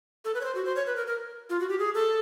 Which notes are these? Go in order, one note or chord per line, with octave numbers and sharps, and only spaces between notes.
A4
B4
C#5
C5
F#4
C5
C#5
B4
A#4
A#4
F4
F#4
G4
G#4
A4